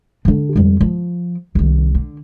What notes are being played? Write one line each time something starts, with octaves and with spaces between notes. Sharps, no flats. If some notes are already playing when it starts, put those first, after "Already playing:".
D3 D4
F2 G3
F3
C2 D#3
D3